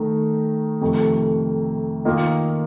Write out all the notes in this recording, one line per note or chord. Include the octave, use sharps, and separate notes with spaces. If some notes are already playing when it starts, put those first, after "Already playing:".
Already playing: D#3 A3 D#4
F2 C3 D#3 A3
D#3 A#3 F4 A#4 D#5